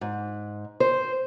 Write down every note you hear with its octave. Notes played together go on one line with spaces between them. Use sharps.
G#2
C5